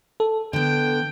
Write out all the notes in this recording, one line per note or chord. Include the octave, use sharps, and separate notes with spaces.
A4
D3 B3 G5